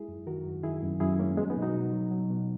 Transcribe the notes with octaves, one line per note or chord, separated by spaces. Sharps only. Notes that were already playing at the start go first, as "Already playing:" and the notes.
Already playing: G#3 E4 G#4
F#2
D#3 F#4 A#4
F#2
D#3 E4 G#4
F#2
F#2 E4 G#4
G#3 A#3 C#4
F#3 G#3 B3
B3 D#4
B2
D#4 F#4
B2
F#3
F#3
B2